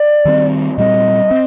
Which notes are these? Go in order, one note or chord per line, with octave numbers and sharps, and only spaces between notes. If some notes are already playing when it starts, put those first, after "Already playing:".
Already playing: D5
D#3 G3 C4
A#2 G3 C4 D#5
C4